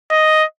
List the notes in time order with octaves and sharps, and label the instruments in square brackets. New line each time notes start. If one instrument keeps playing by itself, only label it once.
[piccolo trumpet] D#5